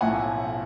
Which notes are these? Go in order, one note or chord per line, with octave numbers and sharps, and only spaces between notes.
B1 A2 F3 A3 C#4 F#5 G#5